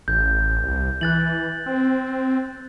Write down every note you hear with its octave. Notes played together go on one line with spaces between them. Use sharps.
A1 G6
C2
E3 F#6 A6 F#7
C4